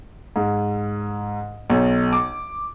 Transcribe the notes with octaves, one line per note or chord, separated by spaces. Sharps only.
G#2
B1
D6